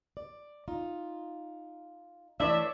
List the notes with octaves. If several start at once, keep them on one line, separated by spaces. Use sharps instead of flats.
D5
D#4 F4
E3 A3 D4 C#5 D5 E5 C#6